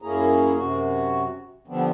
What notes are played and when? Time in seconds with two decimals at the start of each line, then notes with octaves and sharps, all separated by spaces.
0.02 F#2 A#3 C#4 E4 G#4 A#5
0.56 F#2 C3 F#4
1.68 D3 F3 G3 B3 C4 D4